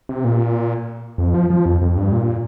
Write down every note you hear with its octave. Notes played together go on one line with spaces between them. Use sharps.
C3
A#2
F2
F3
F3
F2
F2
G2
A#2